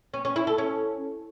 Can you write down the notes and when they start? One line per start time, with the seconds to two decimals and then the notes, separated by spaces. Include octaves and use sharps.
0.14 C#4
0.25 C#4
0.36 E4
0.47 A4
0.58 C#4